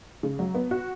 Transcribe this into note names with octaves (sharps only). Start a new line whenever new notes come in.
C#3
F#3
B3
F#4